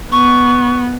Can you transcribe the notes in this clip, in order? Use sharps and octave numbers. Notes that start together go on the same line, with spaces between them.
B3 C#6